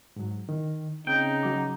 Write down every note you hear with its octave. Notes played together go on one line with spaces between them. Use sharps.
G#2 F#3
D#3
C#3 C4 D#4 G5
F#3 D6